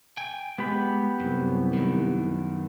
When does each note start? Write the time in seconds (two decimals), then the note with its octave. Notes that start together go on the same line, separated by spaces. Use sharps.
0.17 G5 G#5
0.58 G#3 B3 G4 B5
1.20 C2 F#2
1.73 F#2 D#3